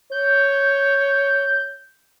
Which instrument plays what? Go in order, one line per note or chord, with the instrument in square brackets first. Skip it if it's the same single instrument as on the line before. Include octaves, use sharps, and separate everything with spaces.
[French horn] C#5 [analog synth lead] G6